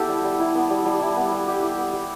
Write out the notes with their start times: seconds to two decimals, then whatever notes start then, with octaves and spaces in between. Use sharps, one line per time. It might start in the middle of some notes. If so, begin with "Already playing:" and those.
Already playing: B3 E4 G4 A4
0.09 G3
0.25 G3
0.40 E4
0.55 B3
0.70 G3
0.86 G3
1.01 E4
1.17 B3
1.32 G3
1.47 G3 G4
1.62 E4
1.78 B3
1.93 G3